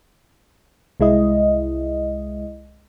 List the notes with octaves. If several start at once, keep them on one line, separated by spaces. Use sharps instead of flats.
C2 G#3 E4 D#5